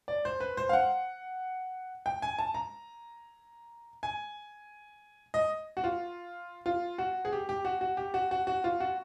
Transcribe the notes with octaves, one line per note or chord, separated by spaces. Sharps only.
D5
C5
B4
C5
F5
F#5
G5
G#5
A5
A#5
G#5
D#5
F#4
F4
F4
F#4
G#4
G4
G4
F#4
F#4
G4
F#4
F#4
F#4
F4
F#4